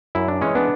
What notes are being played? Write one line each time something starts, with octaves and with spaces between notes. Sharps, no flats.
F#2 E4
D4
E3 G#3 C#4
B3 D4